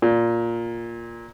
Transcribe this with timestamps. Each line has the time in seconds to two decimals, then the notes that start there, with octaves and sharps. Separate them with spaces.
0.02 A#2